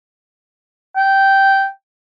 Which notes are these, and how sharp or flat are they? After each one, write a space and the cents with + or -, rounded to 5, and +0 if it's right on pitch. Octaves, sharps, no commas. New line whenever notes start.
G5 -10